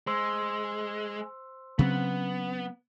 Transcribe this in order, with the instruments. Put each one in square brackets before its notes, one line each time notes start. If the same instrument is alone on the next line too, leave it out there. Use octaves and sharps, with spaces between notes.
[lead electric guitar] G#3 [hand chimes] C5 C6 E6
[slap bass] C#3 F#3 C4 [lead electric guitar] B3